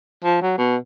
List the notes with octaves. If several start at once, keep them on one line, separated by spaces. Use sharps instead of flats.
F3
F#3
B2